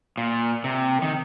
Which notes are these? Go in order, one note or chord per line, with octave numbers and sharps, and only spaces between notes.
A#2
C3
D#3